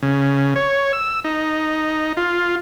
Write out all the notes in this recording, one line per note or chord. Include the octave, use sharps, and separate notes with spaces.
C#3
C#5
E6
D#4
F4